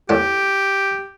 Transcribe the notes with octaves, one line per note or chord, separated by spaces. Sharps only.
A2 G4 F#5